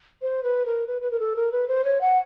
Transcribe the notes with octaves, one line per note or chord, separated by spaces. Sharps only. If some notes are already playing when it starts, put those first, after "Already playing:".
C5
B4
A#4
B4
B4
A#4
A4
A#4
B4
C5
C#5
F#5